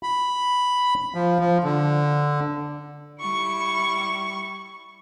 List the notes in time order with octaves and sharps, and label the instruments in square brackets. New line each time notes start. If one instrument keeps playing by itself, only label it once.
[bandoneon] B5
F3
F3
D3
[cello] G3 E4 [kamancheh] C#6